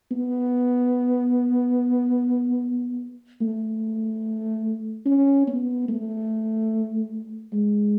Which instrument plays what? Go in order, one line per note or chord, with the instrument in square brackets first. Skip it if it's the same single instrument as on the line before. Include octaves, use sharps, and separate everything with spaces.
[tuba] B3
A3
C#4
B3
A3
G#3